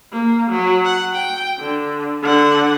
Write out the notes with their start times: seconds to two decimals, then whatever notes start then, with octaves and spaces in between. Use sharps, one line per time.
0.13 A#3
0.51 F#3
0.85 F#5
1.16 G5
1.60 D3
2.22 D3 F#5